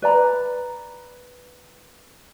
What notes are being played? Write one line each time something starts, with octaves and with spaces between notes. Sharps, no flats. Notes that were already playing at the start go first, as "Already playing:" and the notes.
B4 D5 A#5 B5